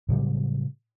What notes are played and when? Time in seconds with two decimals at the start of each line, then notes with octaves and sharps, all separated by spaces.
0.09 A2 C#3 F#3 G3